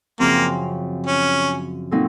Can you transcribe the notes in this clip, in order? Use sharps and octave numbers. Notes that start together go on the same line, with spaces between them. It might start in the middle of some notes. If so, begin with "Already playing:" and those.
F#2 C#3 F3 A#3 C4
C#4
A#2 F#3 C4 D#4 A4